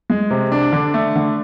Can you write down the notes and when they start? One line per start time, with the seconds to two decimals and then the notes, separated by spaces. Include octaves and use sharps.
0.10 G#3
0.30 C3
0.52 D4
0.72 D3
0.94 A3
1.16 D3